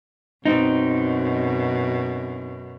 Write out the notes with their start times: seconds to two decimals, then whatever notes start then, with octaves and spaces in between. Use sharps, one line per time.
0.46 F#2 B2 C4 D#4